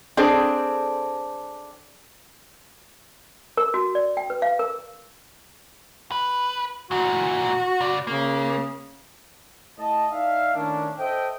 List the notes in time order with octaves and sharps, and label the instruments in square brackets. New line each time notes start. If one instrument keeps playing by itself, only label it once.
[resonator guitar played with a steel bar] C4 D4 G#4 A4 C5
[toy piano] A#4
F#4
D5
G5
B4
F5
A#4
[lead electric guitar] B4
[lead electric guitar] A#2 E3 [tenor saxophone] F#4
[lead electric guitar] C#3 D5
[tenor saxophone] C#3 [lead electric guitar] A#3
[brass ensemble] A2 D#5 A5
D#4 D5 E5 F5
A2 D#3 A#3 C#4 D4
A4 C5 D#5 E5 G5